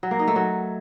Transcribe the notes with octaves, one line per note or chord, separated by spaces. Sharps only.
F#3
A#3
D#4
A3
F#3